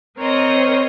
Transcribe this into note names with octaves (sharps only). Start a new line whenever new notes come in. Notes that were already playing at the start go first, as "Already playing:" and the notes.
C4 A#4 C5 C#5 D#5 A#5